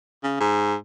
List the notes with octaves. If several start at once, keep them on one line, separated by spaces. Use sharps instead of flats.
C#3
G#2